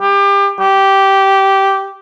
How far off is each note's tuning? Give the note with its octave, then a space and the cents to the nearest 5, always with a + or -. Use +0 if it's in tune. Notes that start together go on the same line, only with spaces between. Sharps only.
G4 +30
G4 -10